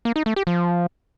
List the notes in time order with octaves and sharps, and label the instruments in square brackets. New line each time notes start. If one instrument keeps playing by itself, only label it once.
[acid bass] A#3
D#4
A3
G4
F3